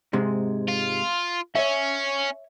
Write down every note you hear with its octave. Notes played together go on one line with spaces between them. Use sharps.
G#2 C3 G#3
F4
C#4 C#5 E5